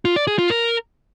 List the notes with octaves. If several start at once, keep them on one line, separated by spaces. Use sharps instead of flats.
F4
D5
G#4
F4
A#4